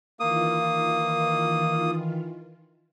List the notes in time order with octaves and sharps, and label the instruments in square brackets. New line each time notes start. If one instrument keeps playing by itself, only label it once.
[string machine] D#3 E3 F4 [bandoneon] A#3 D#6